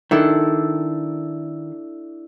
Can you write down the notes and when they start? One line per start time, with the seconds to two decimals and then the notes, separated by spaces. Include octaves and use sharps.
0.11 D#3 D4 E4 A4